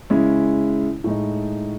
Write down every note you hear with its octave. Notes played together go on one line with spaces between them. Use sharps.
C#3 G#3 C#4 E4
A2 G#3 D#4